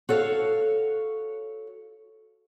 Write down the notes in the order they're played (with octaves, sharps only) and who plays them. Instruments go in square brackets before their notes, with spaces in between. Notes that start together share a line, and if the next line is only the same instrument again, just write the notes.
[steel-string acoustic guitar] F#4 A4 C#5 F5